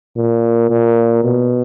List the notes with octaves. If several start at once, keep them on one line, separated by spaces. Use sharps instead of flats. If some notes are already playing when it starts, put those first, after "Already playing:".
A#2
A#2
B2